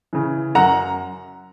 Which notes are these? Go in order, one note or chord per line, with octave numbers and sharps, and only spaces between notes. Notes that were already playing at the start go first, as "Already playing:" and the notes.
C#3 E3
F#2 F#5 A#5